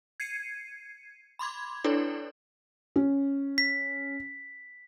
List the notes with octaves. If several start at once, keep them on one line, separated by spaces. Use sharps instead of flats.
G#6 C7 C#7 D#7
B5 C6 D6 G#6
D4 E4 A4 B4 C#5 D5
C#4
B6